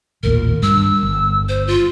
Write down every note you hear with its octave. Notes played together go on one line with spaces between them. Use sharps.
A1 D#2 A#2 A#4
G2 E6
G1
C5
F4